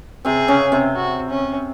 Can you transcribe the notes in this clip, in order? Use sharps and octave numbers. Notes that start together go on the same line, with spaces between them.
C3 C4 G#4
C#3 C#4
C3 C4
F#4
C#4